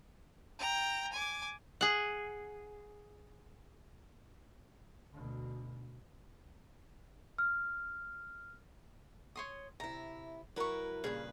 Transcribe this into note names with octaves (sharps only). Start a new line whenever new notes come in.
G5 A#5
G#5 D6
G#4 F#5
D2 B2
F6
C#5 C6 D#6
C3 E4 A#5
F#3 E4 A#4 B4 C#6
G2 A#2 C#3 G#4 B4